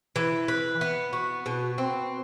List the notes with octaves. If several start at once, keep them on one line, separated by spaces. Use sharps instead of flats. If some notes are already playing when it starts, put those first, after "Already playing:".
E3
B4
B3
F#4
B2
C4